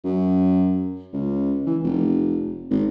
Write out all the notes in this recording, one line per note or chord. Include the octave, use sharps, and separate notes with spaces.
F#2
C#2
E3
F1
G#1